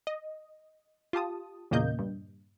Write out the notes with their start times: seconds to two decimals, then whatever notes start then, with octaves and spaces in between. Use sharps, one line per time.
0.07 D#5
1.13 F4 G4 A5 D#6
1.71 E2 A#2 C#3 A#3 D#5 G6
1.99 G2